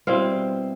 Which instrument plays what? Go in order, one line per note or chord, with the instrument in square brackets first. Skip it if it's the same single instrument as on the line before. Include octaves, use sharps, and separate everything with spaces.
[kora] B2 G3 C4 E4 F5